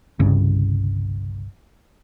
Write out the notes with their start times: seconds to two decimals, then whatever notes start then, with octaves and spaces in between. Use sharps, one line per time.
0.20 G1 C2 G2 C#3